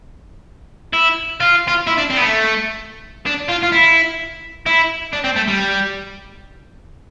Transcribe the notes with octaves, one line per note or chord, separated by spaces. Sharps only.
E4
F4
F4
E4
D4
C4
B3
A3
D4
F4
F4
E4
E4
D4
C4
A3
G3